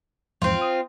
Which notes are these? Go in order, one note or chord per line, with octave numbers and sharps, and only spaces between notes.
E2 G#2 F3 C4 F4
D#6